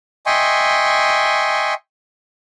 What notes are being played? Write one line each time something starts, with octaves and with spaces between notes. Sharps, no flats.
D#5 E5 G5 G#5 C6 C#6